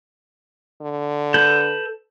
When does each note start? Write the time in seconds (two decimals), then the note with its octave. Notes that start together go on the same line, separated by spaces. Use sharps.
0.81 D3
1.34 A4 B4 G6